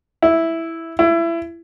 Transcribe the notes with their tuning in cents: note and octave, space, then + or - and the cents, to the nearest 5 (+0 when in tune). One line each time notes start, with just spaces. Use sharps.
E4 -5
E4 +25